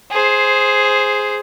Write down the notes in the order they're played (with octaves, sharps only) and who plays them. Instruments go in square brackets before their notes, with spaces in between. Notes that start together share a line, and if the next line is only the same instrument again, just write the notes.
[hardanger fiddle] G#4 C5